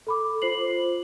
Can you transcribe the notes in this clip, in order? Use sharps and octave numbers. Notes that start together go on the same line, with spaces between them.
A4 B5 D6
F4 C5 C7 F#7